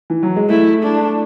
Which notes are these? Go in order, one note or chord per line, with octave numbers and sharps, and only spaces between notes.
E3
F#3
G#3
A3 E4
D4